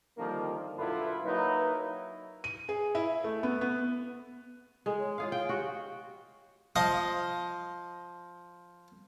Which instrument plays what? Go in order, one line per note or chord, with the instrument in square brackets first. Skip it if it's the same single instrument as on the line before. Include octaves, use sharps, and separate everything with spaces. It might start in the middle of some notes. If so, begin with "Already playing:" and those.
[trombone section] D3 D#3 F3 G3 A#3 C4
B1 F#2 D3 E4 F4 B4
F#3 A#3 D#4 E4 B4
[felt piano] D#7
G#4
E4
A3
B3
B3
[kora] G#3 [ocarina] A4
[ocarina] C#5
[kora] F4 G#4 F5
[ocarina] F5 [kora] G5
[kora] F#4 [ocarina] G4
[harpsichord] F3 D#5 F5 D#6